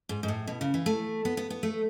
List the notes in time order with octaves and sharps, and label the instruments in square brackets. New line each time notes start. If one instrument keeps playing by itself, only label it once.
[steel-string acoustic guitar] G#2
G#2
A2
B2
C#3
E3
A3
B3
B3
B3
A3